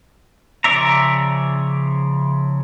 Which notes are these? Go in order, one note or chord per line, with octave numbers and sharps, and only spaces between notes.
C#3 F3 D5 E5 A#5